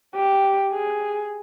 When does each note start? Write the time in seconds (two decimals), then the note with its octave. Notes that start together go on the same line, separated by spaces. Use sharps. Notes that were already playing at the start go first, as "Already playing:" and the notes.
0.16 G4
0.73 G#4